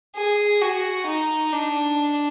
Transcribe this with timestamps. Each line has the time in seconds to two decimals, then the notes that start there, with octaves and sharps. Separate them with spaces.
0.15 G#4
0.61 F#4
1.06 D#4
1.53 D4